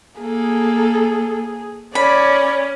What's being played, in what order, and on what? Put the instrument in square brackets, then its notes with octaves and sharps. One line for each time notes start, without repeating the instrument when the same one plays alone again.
[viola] A#3 A4 [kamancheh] G#4
[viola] C#4 [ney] C#5 [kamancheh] D5 [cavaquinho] B5